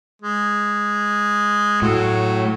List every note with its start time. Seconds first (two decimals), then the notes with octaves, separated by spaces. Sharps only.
0.22 G#3
1.82 A2 F#3